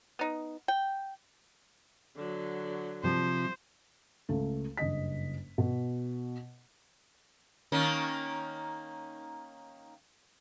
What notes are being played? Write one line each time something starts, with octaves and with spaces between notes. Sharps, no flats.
B3 D#4
G5
D3 F#3
C3 F3 C5
C#2 A3
F#1 G2 D#5 B6
B2
D#3 A#3 C#4